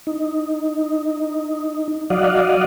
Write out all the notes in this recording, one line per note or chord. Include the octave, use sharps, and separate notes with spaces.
D#4
F#3 D5 D#5 F5 F#5